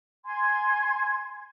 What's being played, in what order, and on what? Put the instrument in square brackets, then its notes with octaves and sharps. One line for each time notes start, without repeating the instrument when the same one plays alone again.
[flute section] G#5 C6 G#6